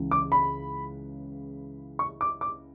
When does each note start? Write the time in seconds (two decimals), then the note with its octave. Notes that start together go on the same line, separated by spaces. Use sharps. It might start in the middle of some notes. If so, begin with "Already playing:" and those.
Already playing: C#2 C#3 E3
0.11 D6
0.32 B5
1.99 C#6
2.21 D6
2.41 D6